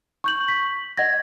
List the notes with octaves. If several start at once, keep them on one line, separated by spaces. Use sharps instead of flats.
C#6 G6 F#7
B6
D#5 F#5 G#6 A#6